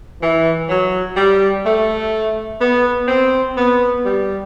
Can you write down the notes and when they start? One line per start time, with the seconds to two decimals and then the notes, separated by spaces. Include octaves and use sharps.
0.22 E3
0.69 F#3
1.17 G3
1.65 A3
2.61 B3
3.08 C4
3.57 B3
4.04 G3